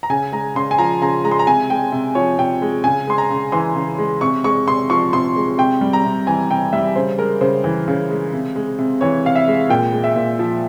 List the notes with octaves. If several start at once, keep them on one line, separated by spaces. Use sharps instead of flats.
A#5
C#3 G#5
G#3 A#5
C#3 C6
G#5
F3 A#5
C#3 A#5
G#3 A#5
C6
A#5
C3 G#5
G#3 G5
C3
F3 C#5
C3 G5
G#3
C#3 G#5
G#3 C6
A#5
C#3
E3 C6
C#3
G#3
C3 C#6
G#3 C#6
C3 C6
F3 C#6
C3 C6
G#3
C3 G5
G3
A#5
C3
E3 G#5
C3 G5
G3 E5
C#3 C5
G#3 A#4
C#3 C5
E3
C#3
G#3
C3
G#3
C3
E3 C#5
C3 F5
E5
G#3
A#2 G5
G#3
E5
A#2
F3